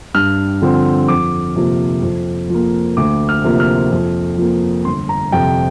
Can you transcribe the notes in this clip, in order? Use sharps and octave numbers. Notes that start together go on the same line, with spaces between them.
G2 F6
D3 F3 C4
F2 D6
C3 F3 A#3
F2
F3 A#3
D2 D6
F6
C3 F3 A#3
F6
F2
F3 A#3
G1 C6
A#5
F2 C3 F3 G5